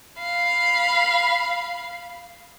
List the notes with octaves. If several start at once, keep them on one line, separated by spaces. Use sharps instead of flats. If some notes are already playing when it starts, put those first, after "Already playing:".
F5 B5